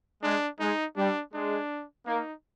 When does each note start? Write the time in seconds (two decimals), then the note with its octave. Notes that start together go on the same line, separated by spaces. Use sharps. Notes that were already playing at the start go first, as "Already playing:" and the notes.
0.23 G#3 D4
0.59 G#3 D#4
0.96 G3 D4
1.33 G#3 D4
2.06 A#3 D#4